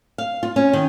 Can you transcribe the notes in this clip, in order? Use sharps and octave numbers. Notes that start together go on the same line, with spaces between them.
F5
F4
C#4
D#3